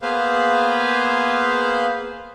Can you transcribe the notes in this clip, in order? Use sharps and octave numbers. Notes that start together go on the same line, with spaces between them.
A#3 B3 G#4 B4 C5 F5